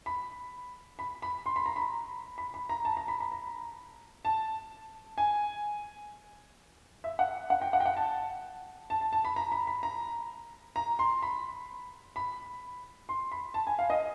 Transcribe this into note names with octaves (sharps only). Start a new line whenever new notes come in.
B5
B5
B5
C6
B5
A#5
B5
B5
B5
A#5
A5
A#5
B5
B5
A#5
A5
G#5
E5
F#5
F#5
G5
F#5
G5
F#5
A5
A5
A5
A5
B5
A#5
B5
B5
A#5
A#5
C6
B5
B5
C6
B5
A5
G#5
F5
D#5